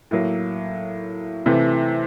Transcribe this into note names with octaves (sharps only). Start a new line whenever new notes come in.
A2 F#3 A#3
C3 E3 A3